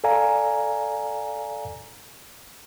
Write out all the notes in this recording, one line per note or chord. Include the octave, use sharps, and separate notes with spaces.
A4 D5 F5 G#5 A#5